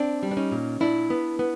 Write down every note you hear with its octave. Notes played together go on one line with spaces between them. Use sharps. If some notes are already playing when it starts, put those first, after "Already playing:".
Already playing: C4 D4
G3
D4
C#4 D#4
A#2
A#2 D4 E4
B3
B3